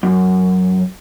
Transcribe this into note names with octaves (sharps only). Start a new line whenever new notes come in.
F#2